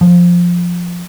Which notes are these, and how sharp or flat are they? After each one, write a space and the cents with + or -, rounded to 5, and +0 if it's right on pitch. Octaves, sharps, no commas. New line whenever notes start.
F3 +5